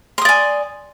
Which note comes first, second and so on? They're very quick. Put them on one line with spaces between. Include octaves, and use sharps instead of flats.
C6 D#6 D5 G#5